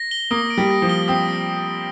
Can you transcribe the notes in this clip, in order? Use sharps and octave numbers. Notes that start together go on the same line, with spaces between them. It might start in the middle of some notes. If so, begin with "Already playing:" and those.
Already playing: A#6
G7
A#3 D#6
D7
G3
A#6
F3
G7
C4 D#6